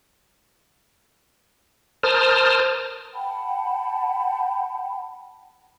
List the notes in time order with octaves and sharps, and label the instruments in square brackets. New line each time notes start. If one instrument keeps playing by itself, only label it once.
[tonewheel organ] A#4 C5 A5 D#6 F6
[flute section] F#5 G5 A5 B5